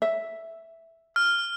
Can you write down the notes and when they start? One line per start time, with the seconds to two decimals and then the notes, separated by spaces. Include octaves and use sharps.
0.02 E5
1.16 F6